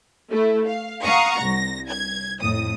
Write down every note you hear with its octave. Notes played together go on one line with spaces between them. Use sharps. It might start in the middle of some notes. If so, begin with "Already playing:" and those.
A3 E4
F5
F5 F#5 A#5 C#6 D#6
C2 A#6
G#6
F2 A2 D#6